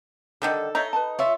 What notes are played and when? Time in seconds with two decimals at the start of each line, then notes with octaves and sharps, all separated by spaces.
0.42 D3 D#3 G3 A4
0.75 D#4 C#5 E5 A#5
0.93 B4 A5
1.19 F4 C#5 E5